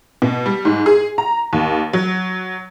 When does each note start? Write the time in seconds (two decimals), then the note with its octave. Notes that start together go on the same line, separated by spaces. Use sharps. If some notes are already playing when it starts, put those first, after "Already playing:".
0.22 B2
0.46 G3
0.65 G#2
0.86 G#4
1.18 A#5
1.53 D#2
1.93 F#3